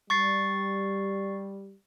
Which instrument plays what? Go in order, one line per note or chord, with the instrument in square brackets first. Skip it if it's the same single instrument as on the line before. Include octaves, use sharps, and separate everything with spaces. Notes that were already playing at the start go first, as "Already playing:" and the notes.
[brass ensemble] G3 [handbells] C#6 A6 C7